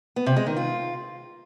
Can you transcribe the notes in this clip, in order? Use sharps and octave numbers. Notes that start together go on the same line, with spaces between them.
B3
C3
G#3
D#3
F4